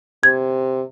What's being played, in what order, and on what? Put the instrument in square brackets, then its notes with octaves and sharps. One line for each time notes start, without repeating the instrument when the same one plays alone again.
[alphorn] C3 [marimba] G#6